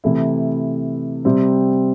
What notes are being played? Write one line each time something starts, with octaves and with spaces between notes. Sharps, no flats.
C3 E3 A3 E4
C3 G3 C4